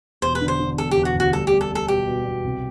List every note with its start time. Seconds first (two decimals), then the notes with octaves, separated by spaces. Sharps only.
0.22 E1 C5
0.35 B4
0.41 D3
0.48 C5
0.60 D3
0.78 E1 A4
0.91 G4
0.97 E1
1.05 F#4
1.15 D2 F#4
1.33 G3 A4
1.47 G3 G4
1.61 A4
1.70 G3
1.75 A4
1.88 B2 G4
2.07 B2
2.25 B2
2.44 C2